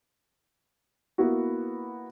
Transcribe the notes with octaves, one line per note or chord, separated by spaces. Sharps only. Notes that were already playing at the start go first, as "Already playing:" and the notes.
A#3 B3 E4 F#4